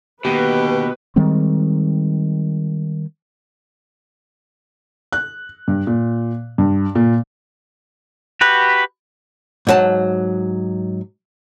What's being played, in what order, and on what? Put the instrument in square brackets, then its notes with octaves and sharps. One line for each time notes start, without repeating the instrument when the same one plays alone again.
[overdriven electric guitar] B2 [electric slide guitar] D3 D#3 A#3 [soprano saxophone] G4 [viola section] B4
[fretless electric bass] D#3 G3 G#3 C4
[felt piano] F#6
G2
A#2
G2
A#2
[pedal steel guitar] F#4 G4 B4
[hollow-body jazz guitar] G#2 F#3 A5